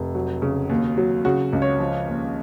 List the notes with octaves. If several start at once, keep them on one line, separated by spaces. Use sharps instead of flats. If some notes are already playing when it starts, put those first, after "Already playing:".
Already playing: F1
F#3
C#3
D#2
F#3
C#3 F#4
C#2
C#5
F3
D#2